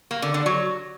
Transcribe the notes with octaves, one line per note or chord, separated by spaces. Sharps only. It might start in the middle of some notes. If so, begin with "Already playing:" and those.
A#3
D3
D3
F#3